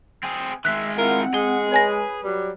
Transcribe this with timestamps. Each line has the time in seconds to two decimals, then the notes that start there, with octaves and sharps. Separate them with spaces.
0.23 C4 G#4
0.65 D#3 G#3 E5 F#6 B6
0.98 C4 E4 F4 A#4 F#5
1.34 G#3 G#4 G7
1.72 B4 C#5 G#5 A#6
2.24 F#3 G3